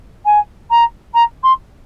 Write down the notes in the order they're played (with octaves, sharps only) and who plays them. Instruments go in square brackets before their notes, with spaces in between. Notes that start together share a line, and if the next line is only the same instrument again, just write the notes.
[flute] G#5
A#5
A#5
C6